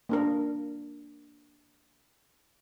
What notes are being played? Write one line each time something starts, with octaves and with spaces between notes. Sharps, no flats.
A#3 D4 A#4